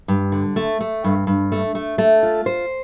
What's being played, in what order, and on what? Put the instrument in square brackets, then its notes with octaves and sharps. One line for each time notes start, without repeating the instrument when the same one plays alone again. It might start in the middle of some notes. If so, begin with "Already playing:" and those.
[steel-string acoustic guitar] G2
D3
A3
A3
G2
G2
A3
A3
A3
F4
C5